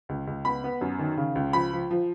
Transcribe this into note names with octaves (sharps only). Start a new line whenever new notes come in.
C#2
C#2
B3 B5
B3
F#2
D#3
C#3
C#2
F3 B5
F3
F3